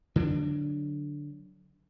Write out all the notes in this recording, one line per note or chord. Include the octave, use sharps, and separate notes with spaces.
D3 F#3 A3 D4